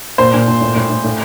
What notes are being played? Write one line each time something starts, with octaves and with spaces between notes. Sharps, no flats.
A#2 C5
A#2
A#2
A2
A2
A2
A2